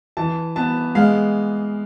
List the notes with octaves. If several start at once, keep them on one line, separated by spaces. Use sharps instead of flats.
E3 A5
B3 A5
G#3 F5